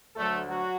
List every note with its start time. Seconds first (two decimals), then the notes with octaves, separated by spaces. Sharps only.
0.14 D2 D3 F#3 A3 A4
0.46 F#3 F#4